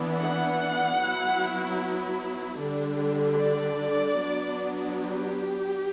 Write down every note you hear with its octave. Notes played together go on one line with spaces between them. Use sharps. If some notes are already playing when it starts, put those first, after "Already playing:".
Already playing: E3 B3 D4
F#5
F#3 B3 E4
D3 G3 D4
D5
F#3 B3 D4
G4